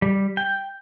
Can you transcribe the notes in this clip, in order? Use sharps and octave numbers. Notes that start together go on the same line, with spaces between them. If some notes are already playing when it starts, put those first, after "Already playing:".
G3
G5